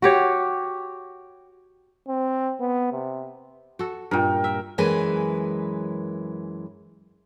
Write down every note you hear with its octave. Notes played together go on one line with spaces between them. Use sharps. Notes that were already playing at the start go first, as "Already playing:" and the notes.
F#4 G4 C#5
C4
B3
C3
F#4 A4
G2 A#2 A#4 G5
E5
F#2 E3 G#3 B4 G#5